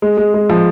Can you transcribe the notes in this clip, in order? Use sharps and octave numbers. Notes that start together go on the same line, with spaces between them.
G#3
G#3
G#3
F3